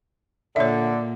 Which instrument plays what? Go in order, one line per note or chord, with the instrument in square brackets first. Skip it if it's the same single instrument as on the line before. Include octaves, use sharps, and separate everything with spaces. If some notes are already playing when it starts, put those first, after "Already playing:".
[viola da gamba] A#2 [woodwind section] D3 [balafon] C#5 E5